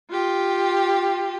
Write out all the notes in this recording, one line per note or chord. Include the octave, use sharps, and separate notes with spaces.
F4 G4